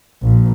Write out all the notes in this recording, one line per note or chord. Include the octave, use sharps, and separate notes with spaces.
A#1